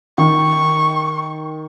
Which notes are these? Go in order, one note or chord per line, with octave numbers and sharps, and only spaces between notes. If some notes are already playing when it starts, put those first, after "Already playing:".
D#3 C#6